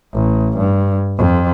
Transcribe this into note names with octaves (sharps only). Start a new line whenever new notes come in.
A1
G2
F2